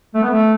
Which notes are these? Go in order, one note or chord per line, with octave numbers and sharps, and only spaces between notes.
A3
B3
A3